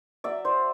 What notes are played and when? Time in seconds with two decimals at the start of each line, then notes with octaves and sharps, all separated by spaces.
0.24 F#3 D5 E5
0.45 C5 D5